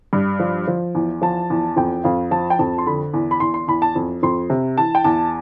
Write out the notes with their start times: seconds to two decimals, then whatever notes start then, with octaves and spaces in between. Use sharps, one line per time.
0.13 G2
0.40 F3
0.68 F3
0.95 E2
1.22 F3 A5
1.50 E2
1.76 F2 G5
2.04 F2 F5
2.31 F3 A5
2.50 G5
2.59 F2 A5
2.78 C6
2.86 D3 B5
3.13 E2
3.31 B5
3.40 E2 C6
3.54 C6
3.68 E2 B5
3.82 A5
3.95 F2
4.23 F2 C6
4.50 C3
4.77 E3 A5
4.95 G5
5.04 E2 A5